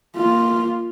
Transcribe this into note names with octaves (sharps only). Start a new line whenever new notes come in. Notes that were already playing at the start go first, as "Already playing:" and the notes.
A#3 F4